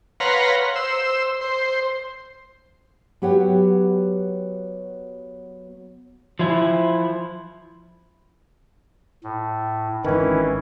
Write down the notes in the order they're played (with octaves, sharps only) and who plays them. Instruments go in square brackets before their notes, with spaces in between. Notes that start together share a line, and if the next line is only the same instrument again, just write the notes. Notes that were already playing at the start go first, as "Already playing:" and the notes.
[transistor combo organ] B4 C#5 F5 F#5 A#5 C6
C5 E6
C5
[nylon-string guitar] F#3 B3 G4 C#5 F#5
[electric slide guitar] F3 E4
[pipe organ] A2
[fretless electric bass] G#1 D#3 [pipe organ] E3 C#4 E4